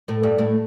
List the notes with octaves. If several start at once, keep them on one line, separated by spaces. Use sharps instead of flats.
A2 A3
G2 G3
A2 A3